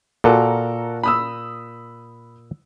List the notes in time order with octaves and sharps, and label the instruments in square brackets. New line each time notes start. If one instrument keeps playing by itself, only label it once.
[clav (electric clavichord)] A#2 [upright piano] F#4 A4 A#4
[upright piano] B5 D#6 E6